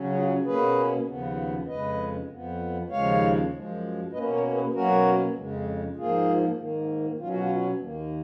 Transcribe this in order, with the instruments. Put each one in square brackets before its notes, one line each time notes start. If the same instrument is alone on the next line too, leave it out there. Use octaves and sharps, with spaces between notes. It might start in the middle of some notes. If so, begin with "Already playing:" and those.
Already playing: [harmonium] C#3 F#3 C#4
F4 G#4
B2 A#3 C#4 G#4 B4
D#2 C#3 F3 B3
F2 C#3 G#3 B4 D#5
F2 F3 B3
D#2 C#3 F3 G#3 C#5 F5
F#2 F3 G#3
B2 A#3 C#4 B4 D#5
A#4 C#5
G#4 B4
B2 F#3 A#3 C#4 F#4 A#4
F2 C#3 G#3
G#2 F3 A#3 F4 G#4
G#2 D#3 A#3
B2 F#3 C#4 F4
F#4
F4
D#2 D#3 A#3